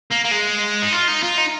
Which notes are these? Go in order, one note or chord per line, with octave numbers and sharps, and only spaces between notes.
A#3
A#3
G#3
D#4
F4
D#4
F4
D#4